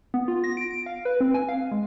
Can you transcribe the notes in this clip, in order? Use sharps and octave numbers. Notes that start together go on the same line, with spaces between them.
B3
F4
A#6
D7
D7
F5
B4
C4
G#5
F5
G#3